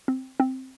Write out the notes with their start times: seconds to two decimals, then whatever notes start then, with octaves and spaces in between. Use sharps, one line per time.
0.08 C4
0.40 C4